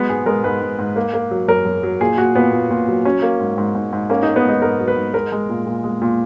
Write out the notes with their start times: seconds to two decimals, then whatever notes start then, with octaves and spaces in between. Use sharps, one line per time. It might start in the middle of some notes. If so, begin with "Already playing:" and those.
Already playing: F#3 G#3 B3
0.09 G#2 G#4
0.26 G#3 A#4
0.44 G#2 B4
0.62 G#2
0.79 G#2
0.96 A#3
1.14 A#3
1.31 F#3
1.48 F#2 A#4
1.65 F#2
1.83 F#3
2.01 A#2 G#4
2.18 A#2 F#4
2.35 A#2 B3
2.53 A#2
2.70 A#2
2.88 F#3
3.05 F#3 C#4
3.22 A#3
3.40 G#2
3.58 G#2
3.75 G#2
3.93 G#2
4.10 A#3 C#4
4.23 A#3 D#4
4.36 B3
4.45 G#2 D#4
4.62 G#2 A#4
4.80 F#3
4.88 B4
4.97 G#2
5.14 G#3 A#4
5.32 G#3
5.49 A#2
5.67 A#2
5.84 G#3
6.02 A#2